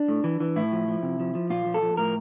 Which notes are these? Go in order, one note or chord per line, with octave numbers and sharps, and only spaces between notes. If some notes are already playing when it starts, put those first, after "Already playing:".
Already playing: D4
A2
E3
E3
A2 E4
F3
F3
C3
F3
F3
A#2 F4
F3
A4
F3
A2 A#4